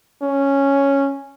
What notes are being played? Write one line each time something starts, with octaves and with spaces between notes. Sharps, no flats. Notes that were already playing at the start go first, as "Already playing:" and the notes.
C#4